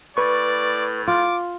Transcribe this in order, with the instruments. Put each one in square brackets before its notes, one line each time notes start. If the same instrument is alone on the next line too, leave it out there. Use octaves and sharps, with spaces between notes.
[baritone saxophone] A2 [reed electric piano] B4 C#6 [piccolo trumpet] D5
[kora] F4 [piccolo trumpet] D6